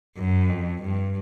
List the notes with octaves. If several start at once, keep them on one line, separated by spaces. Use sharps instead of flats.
F#2
F2
G2